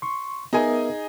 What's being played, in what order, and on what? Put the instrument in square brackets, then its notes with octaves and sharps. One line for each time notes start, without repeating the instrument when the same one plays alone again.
[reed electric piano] C6 C#6
[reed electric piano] B3 A#4 E5 [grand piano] D#4 G#4 G#5